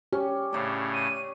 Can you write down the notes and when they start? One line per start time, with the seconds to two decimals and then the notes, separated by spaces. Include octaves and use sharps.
0.13 C#4 G4
0.53 A2 C#3 C#5 D5
0.94 D#7